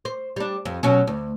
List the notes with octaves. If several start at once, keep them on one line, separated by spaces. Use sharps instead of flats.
C5
G3 D4
F2
B2 F#3 C#4
D2